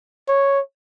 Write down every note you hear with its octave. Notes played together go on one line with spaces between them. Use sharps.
C#5